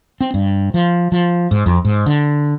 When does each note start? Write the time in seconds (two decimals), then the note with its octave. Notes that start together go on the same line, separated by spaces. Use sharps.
0.21 C4
0.34 G2
0.74 F3
1.12 F3
1.51 G#2
1.66 F2
1.85 G#2
2.06 D3